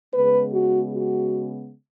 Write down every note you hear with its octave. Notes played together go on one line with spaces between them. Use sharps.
C#3 G#3 B3 B4
F#4
F#4